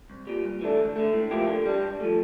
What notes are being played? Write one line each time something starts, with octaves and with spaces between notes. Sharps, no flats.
C2
A#2 G3
G2
E3 A3 D4
D2
D3 A3
A2
F3 A#3 E4 G4
D3
G3 D4
G2
F3 A3